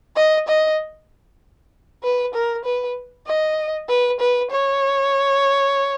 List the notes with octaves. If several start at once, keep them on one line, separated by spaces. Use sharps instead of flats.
D#5
D#5
B4
A#4
B4
D#5
B4
B4
C#5